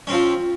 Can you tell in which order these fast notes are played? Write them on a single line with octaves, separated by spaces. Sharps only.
C#4 C4 F3